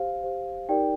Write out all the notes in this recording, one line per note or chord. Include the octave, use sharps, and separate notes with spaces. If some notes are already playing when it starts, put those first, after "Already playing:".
Already playing: G4 C5 F5
G4 C5
D#4 G4 A#4 D5 G5